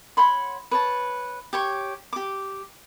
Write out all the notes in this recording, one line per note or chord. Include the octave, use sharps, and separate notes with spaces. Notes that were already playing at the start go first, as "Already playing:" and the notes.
C#5 F#5 B5 C6
B4 C#5 A5
G4 C#5 C#6
G4 D6